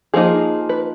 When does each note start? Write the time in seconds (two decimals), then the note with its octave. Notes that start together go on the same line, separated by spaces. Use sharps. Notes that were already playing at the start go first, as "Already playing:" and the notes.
0.14 F3 A#3 D#4 G#4
0.69 B4